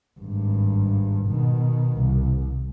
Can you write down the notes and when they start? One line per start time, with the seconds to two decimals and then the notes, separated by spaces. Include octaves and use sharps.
0.20 G#1 G2
1.26 B2 D#3
1.97 C2